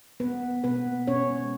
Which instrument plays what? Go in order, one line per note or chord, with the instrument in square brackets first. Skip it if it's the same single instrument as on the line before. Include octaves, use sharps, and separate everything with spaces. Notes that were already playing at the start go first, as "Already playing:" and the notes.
[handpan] B2 B3 B4
A#3
B2 B3 B4
A#3
B2 C#4 C#5
G#3